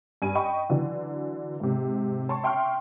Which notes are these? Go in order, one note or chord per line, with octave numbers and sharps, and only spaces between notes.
G2 G#5 D#7
D#5 G5 B5 C#6
D3 E3 F#3
G#2 C3
C#5 A5 C6 C#6
E5 G5 C6 C#6 F6